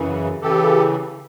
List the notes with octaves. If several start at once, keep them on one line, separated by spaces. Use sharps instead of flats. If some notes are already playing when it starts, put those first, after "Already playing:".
Already playing: F#2 C#3 E3
C#3 E3 G4 A4